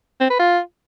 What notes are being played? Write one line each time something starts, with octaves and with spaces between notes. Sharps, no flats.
C4
B4
F4